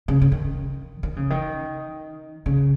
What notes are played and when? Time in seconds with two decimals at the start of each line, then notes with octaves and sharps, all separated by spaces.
0.08 C#3
0.22 C#3
0.32 D#3
1.03 D#3
1.16 C#3
1.30 D#3
2.46 C#3